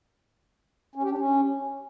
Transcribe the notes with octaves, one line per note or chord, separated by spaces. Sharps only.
C#4
G4
D4
C#4